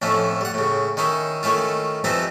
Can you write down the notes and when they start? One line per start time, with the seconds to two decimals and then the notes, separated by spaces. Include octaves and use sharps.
0.02 F2 A2 F3 C#4 E4
0.41 G3 F#5
0.54 A2 C#3
0.97 D#3 C#4 D#4 E4
1.43 D#3 A3 C#4 E4 F4
2.04 E3 F3 G3 C4 D#4 E4